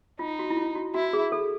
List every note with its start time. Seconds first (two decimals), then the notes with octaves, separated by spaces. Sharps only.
0.19 D#4 F4
0.39 F#4
0.50 E4
0.57 F4
0.75 F#4
0.94 E4 F#4
1.13 G#4
1.32 A4